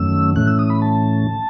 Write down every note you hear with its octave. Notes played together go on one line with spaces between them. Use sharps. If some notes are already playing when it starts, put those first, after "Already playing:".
Already playing: F#2 D#3 F#3 A3 C#4 E6
A2 E3 A3 C#4 F#6
E6
D#6
B5
A5